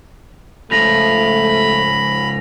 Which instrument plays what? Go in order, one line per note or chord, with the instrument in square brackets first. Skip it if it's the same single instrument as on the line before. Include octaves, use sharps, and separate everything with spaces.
[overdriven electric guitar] C#2 F3 [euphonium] A3 [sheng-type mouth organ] B5 [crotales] A#6 F7